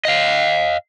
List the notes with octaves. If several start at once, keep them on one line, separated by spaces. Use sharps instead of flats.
D#5 F5